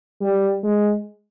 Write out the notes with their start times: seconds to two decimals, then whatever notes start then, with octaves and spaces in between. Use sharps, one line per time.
0.21 G3
0.63 G#3